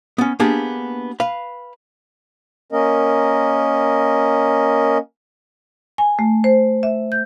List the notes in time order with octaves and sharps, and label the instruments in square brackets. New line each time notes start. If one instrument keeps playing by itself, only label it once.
[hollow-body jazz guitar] B3 C#4
A#3 B3 D4 G4 G#4
B4 F5
[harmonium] A#3 C#4 A#4 D#5
[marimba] G#5
A3
C5
E5
G6